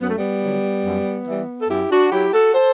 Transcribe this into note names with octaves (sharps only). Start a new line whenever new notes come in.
F#2 B3
A3
G3 B3
D3 F#3
F#2
E3 G3
A4
F#2 E4 G4
D4 F#4
F#3 E4 G4
F#4 A4
A4 C5